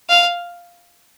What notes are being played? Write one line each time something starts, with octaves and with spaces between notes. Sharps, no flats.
F5